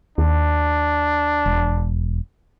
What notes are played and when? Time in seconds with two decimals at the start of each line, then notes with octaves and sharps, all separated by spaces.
0.18 D#2 D4
1.46 E1